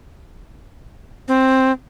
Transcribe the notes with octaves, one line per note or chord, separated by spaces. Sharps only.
C4